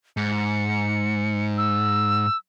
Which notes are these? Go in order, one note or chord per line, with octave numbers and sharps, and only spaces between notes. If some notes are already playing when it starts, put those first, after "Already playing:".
G#2 C#7
E6